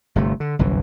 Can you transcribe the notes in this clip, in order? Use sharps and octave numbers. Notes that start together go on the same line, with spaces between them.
G1 C3 A3
D3
G1 C2 F#2 E3